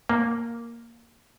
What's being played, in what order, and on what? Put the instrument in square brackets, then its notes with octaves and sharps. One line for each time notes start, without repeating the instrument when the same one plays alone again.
[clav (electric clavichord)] A#3